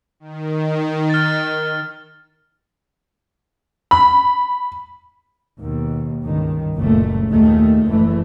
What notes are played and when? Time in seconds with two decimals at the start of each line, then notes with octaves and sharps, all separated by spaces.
0.20 D#3
1.10 F6 A6
3.91 B5
5.59 D#2 B2
6.22 C#2 G2 D#3
6.75 F#1 C#2 A#2 A3
7.30 D#2 A#2 D#3 G#3 A3
7.88 F#1 E3 A3